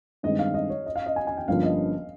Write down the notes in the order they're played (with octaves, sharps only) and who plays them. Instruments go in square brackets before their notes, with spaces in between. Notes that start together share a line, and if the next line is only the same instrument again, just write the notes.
[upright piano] G2 D#3 G#3 C4 D#4 [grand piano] D#5
[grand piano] F5
D#5
C#5
D#5
F5
D#5
G#5
G#5
G5
[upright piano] G1 G2 F3 A#3 C#4 [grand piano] F5
[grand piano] D#5